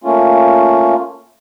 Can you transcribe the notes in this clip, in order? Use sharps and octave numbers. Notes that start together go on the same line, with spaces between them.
A3 A#3 C#4 F4